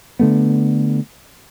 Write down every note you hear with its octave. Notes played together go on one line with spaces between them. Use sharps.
D3 A3 B3